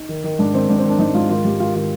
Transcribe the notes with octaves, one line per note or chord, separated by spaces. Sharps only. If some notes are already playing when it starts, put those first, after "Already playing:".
Already playing: D#4
D#3
D#3
G#2 D4
D#3 C4
G#2 D4
C4
D#3
D4
G#2 D#4
G#2 F4
D#3 F4
G#2 G4
D#3 F4
D#3 F4